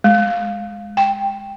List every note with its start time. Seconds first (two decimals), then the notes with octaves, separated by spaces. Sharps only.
0.04 G#3
0.97 G5